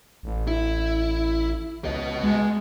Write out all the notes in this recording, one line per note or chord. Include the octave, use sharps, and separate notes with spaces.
A1
E4
C#2 B3 D#5
G#3